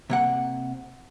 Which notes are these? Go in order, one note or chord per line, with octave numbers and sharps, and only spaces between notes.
C3 A#3 F#5